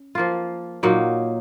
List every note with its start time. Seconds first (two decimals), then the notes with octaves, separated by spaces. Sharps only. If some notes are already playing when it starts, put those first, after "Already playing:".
Already playing: C#4
0.15 F3 A#3 F4
0.83 A#2 F#3 A#3 D#4